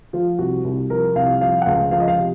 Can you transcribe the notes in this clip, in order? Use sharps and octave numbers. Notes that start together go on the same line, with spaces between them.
F3 F4
C2 F#4
C2
F3 A#4
C2 F5
F3 F5
F#5
C#2 F5
F3 F5
D#5
F5
C3